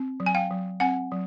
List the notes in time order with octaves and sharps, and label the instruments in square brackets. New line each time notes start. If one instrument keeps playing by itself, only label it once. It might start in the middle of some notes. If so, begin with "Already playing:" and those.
Already playing: [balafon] C4
F#3
G#5
F5 G5
F#3
C4 F#5 G#5
F#3